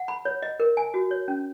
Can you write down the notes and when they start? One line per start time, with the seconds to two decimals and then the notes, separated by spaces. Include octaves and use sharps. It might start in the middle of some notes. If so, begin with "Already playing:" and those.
Already playing: F#5
0.08 B5
0.25 C#5
0.42 D#5
0.60 A#4
0.77 G#5
0.94 F#4
1.11 C#5
1.28 C#4